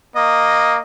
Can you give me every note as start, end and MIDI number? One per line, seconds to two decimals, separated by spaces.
0.16 0.78 58
0.16 0.82 75